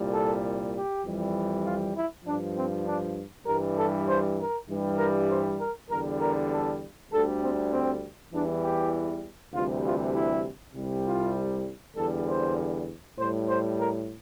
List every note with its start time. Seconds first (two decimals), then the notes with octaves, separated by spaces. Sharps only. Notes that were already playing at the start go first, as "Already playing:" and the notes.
Already playing: C2 A#2 G3
0.13 A4
0.74 G4
1.04 F2 E3 G3
1.65 F4
1.96 E4
2.25 G2 F3 D4
2.56 C4
2.86 D4
3.47 G2 E3 G3 A#4
3.78 A4
4.07 C5
4.38 A#4
4.68 G2 E3 G3
4.98 A#4
5.28 C5
5.59 A#4
5.89 E2 D3 G3 A#4
6.20 A#4
6.51 A4
7.11 D2 D3 G3 A4
7.41 C4
7.72 C4
8.32 E2 E3 G3 D4
8.63 G4
9.54 D2 C3 E3 G3 F4
9.84 F4
10.14 E4
10.75 C2 C3 G3
11.05 F4
11.96 E2 D3 G3 A4
12.27 C5
13.18 A2 C5
13.22 G3
13.48 C5
13.79 A#4